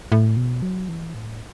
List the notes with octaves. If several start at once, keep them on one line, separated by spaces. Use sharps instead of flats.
A2
B2
F#3
E3
A2